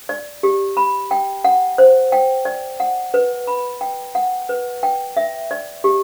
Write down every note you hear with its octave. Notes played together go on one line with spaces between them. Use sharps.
D5
G4
B5
G5
F#5
C5
G5
D5
F#5
B4
B5
G5
F#5
B4
G5
E5
D5
G4